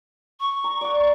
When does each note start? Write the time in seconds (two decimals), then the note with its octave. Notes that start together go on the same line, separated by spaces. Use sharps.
0.40 C#6
0.64 A#5
0.81 D5 F#5